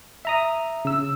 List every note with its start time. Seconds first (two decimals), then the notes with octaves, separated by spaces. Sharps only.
0.25 E5 A#5 D#6
0.85 C#3 E6